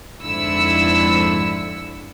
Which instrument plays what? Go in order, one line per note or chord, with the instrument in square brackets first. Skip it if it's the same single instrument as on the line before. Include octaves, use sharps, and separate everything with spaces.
[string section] F2 G#2 D3 E4 E6 C#7